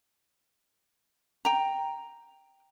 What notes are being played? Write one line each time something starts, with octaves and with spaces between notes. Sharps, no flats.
G5 A#5